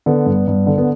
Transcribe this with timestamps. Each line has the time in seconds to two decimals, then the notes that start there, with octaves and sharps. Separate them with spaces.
0.06 D3 B3
0.26 G2
0.48 G2
0.67 D3
0.78 B3